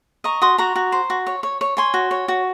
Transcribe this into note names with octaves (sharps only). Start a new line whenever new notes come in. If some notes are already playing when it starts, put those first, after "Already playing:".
D#5 A#5 C#6
F#4 C6 D#6
F#4 A#5 C#6
F#4
C5
F#4
C#5
C#5
C#5
C#5 G#5 C6
F#4
C#5
F#4